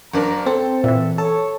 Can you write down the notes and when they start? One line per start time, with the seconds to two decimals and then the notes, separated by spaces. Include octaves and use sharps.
0.13 F#1 D4 A#4 A#5
0.46 C4 A4 G5
0.84 A#2 E3 E5
1.18 A4 C#5 A5